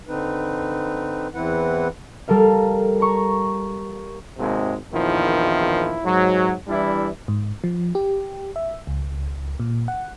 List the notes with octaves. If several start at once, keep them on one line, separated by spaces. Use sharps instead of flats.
D3 C4 D#4 B4
E2 E3 C4 E4 B4 F#5
G3 A4 A#4 F5
A#5 C#6
G#1 D#2 C3 G#3
A#1 E2 D#3 F3 E4
G#2 F#3
E3 G3 D4 E4
G#2
F3
G4
E5
C#2
A#2
F#5